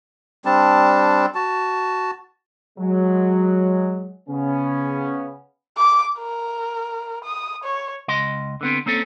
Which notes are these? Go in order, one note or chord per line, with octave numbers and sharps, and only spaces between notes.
G3 C4 D4 A5
F#4 A5
F#3 G#3
C#3 B3 C#4
D6
A#4
D#6
C#5
C#2 D#5 C6
D3 B3 C4
A#3 C4 C#4 A4